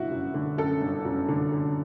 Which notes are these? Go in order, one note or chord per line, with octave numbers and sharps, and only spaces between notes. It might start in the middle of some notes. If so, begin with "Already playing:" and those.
Already playing: G1 E4 F#4
F#2
D3
F#2 A4
G1
F#2
D3
D3